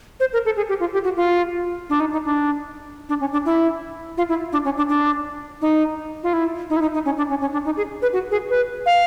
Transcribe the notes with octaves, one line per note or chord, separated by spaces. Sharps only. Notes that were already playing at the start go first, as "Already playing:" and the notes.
C5
A#4
A4
G#4
G4
F4
G4
F#4
F4
D4
D#4
D#4
D4
D4
C#4
D4
E4
F4
E4
D4
C#4
D4
D4
D#4
F4
E4
D#4
E4
D#4
D#4
C#4
D4
C#4
C#4
D4
D#4
G#4
B4
F#4
G#4
B4
F5